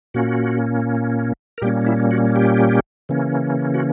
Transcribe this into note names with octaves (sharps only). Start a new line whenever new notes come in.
A#2 A#3 C#4 F#4
A#4
A#2 G3 A#3 C#4 G4
E4
F#4
G4
C#3 E3 A#3 C#4
F#4